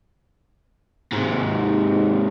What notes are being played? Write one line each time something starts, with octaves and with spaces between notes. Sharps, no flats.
G#2 C3